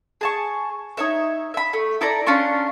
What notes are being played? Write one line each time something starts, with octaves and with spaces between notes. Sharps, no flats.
G#4 A5 C#6
D#4 C#5 E5
E5 B5
A3
E4 A4 D5 A#5
C#4 D4 F4 C#6